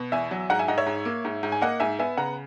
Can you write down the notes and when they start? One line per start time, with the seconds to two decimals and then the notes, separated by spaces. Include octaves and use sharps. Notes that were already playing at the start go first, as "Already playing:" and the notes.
Already playing: B2
0.12 E2 E5 G#5
0.31 F#3
0.50 G#2 F#5 A#5
0.59 E5 G#5
0.68 G#2 D#5 F#5
0.78 C#5 E5
0.86 G#2
1.05 A#3
1.25 G#2
1.43 G#2
1.52 G#5
1.61 A#3 D#5 F#5
1.80 G#2 E5 G#5
1.99 B3 E5 G#5
2.17 C#3 F#5 A#5